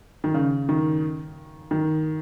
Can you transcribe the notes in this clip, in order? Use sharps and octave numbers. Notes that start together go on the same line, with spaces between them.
D#3
C#3
D#3
D#3